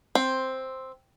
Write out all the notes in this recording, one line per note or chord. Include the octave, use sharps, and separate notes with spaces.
C4